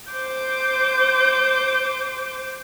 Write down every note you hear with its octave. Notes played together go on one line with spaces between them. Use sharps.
C5 D6 G6